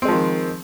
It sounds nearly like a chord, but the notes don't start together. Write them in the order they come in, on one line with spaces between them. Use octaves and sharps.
C4 G#3 F3 D#3